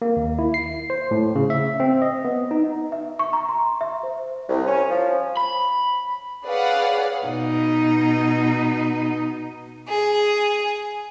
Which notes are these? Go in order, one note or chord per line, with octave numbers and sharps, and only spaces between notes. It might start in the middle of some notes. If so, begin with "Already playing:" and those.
A#3
D#2
E4
C7
C5
A2
C#3
E5
C4
D#5
B3
D#4
E5
C#6
A#5
C6
E5
C5
C2
C#4
F3
B5
G#4 B4 C#5 D5 F5 F#5
B2 D#4
G#4